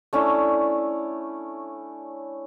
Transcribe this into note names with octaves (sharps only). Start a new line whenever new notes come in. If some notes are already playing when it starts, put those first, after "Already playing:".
A3 C#4 D4 E4